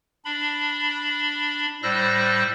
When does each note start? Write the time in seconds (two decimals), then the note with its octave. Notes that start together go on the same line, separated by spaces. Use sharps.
0.25 D4 B5
1.83 A2 G3 C5 E6 F#6 A#6